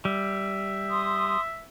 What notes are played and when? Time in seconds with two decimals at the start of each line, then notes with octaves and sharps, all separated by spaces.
0.05 G3 E5
0.90 C6 D#6